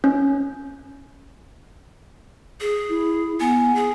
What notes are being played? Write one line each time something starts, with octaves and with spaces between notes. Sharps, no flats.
C#4
G#4
E4
B3 G#5
G#4